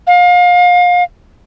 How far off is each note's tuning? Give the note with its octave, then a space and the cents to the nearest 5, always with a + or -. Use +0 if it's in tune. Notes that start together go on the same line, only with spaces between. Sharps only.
F5 +30